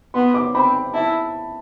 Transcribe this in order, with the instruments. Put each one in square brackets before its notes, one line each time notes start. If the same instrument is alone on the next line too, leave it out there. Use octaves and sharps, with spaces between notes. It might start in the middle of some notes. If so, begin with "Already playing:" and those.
[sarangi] B3 [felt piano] C6
[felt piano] D6
[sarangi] C4 [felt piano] B5
[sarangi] E4 [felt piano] A5